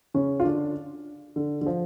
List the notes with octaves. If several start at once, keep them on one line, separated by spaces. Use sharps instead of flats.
C#3 C#4
F4
D3 D4
D3
D3
F3